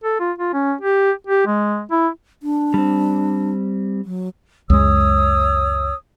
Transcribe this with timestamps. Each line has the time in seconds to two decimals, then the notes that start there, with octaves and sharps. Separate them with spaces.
0.04 A4
0.20 F4
0.39 F4
0.54 C#4
0.81 G4
1.27 G4
1.46 G#3
1.91 E4
2.43 D4
2.74 G3 C4
4.05 F#3
4.70 C#2 F#2 G#3 C#5 D#6 E6